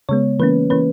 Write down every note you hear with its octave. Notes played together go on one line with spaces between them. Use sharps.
C#3 G#3 B3 C#5
E3 A#3 C#4 B4
E3 A#3 C#4 B4